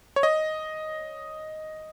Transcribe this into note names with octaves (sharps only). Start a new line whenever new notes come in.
C#5
D#5